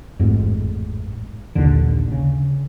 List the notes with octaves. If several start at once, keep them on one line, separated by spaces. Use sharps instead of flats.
A1 F2 G#2
A#1 D#2 D3
C#3